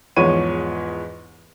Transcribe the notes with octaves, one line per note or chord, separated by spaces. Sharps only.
E2 G#2 F3 C#5 C#6 D#7